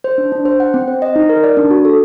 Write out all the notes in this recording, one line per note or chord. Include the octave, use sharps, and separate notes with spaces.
C5
D4
D4
C5
F#5
C4
C5
D#5
D#4
A#4
D5
D4
F#4
A4